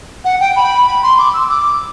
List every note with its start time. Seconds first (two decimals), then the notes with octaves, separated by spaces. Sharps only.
0.25 F#5
0.40 G5
0.56 B5
0.87 B5
1.03 C6
1.18 D6
1.34 E6
1.49 D6